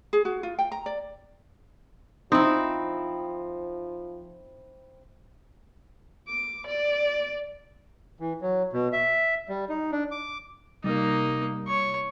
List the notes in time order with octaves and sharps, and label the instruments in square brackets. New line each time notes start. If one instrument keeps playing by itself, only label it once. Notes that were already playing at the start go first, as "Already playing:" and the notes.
[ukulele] G#4
F#4
F4
G5
A#5
D5
[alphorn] F3 [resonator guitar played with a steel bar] C4 E4 [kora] D#4
[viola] D6
D5
[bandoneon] E3
F#3
B2
E5
G3
D#4
D4
D6
[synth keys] C3 G3 [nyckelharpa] A#3 D#4
[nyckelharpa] C#5 C#6